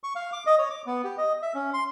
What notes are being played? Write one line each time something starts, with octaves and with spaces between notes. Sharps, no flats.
C#6
F5
D6
D#5
C#5
D6
B3
G4
D#5
E5
C#4
C6